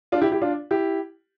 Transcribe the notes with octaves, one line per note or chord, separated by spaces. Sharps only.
D4 F4
E4 G4
E4 G4
D4 F4
E4 G4